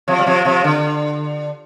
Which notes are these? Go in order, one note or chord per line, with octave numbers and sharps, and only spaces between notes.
C3 F3
G3
C3 F3
C3 F3
D3